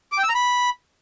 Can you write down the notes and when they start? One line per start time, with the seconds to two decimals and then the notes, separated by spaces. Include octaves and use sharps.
0.12 D6
0.18 G5
0.23 E6
0.29 A#5
0.35 B5